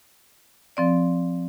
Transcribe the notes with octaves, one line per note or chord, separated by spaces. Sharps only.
F3 C4 D5